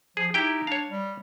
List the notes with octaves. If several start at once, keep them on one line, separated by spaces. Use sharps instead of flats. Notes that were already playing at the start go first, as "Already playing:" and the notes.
F3 G#4
D#4 E4 G4 G5
D4 C#5 F5
G3